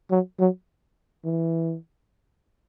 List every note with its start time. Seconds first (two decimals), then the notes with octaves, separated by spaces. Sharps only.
0.11 F#3
0.39 F#3
1.25 E3